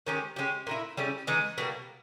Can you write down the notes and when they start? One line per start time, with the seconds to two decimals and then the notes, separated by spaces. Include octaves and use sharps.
0.07 D#3 G#3 C#4 G4
0.36 G#3 C#4 G4
0.67 A#2 A#3 E4
0.97 C#3 G3 C#4 E4
1.27 E3 G#3 D#4
1.58 B2 G3 A#3